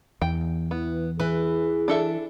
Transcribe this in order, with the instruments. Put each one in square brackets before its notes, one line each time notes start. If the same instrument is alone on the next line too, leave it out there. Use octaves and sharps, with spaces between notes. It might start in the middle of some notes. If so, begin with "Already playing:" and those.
[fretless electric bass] E2 [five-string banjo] G5
[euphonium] E3 [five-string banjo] B3
[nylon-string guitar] E3 [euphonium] G#4 [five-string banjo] B4
[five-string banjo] D4 A4 E5